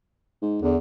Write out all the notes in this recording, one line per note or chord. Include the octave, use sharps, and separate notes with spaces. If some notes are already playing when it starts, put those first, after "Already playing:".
G#2
E2 D3